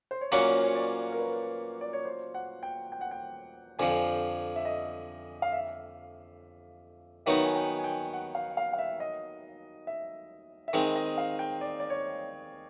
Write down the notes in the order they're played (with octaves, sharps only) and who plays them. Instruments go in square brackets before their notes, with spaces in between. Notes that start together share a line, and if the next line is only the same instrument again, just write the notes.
[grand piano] C5
C#5
[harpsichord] A#2 F#3 A#3 C#4 F#4 [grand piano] D5
[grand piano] C5
C#5
D5
A#4
B4
D5
C#5
C5
F#5
G5
G5
F#5
G5
[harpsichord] F2 D3 F3 [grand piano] G#5
[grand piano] E5
D#5
F5
E5
[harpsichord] D#3 F#3 B3 D#4 [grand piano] E5
[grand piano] G#5
G5
G#5
G5
F#5
F5
F5
F5
E5
D#5
E5
E5
[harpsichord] D#3 G#3 C4 [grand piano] D#5
[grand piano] D#5
F5
G5
D5
D5
C#5